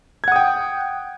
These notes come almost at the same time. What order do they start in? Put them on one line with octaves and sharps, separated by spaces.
G#6 F#5 D#6 G5